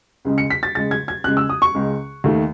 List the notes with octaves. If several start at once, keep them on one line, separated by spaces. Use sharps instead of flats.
C#2 C#3 G#3
C#7
B6
A6
C#2 C#3 G#3 A6
G#6
G#6
C#2 C#3 G#3 F#6
E6
D#6
C#6
C#2 C#3 G#3
D#2 D#3 A3